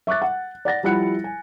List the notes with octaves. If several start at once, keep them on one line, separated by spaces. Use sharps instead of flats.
E5 C#6 D6 F#6 A6
F#5
D5 F#5 A6 A#6
F3 G3 E4 F#5 F#6 C#7
G#5